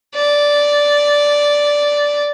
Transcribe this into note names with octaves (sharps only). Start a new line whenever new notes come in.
D5